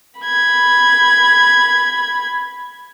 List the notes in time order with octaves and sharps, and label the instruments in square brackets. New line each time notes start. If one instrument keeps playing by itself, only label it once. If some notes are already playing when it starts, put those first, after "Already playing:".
[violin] B5 G#6